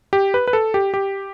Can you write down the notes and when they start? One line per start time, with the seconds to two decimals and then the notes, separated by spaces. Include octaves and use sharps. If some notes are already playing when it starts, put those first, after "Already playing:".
0.13 G4
0.34 B4
0.48 B4
0.53 A4
0.74 G4
0.94 G4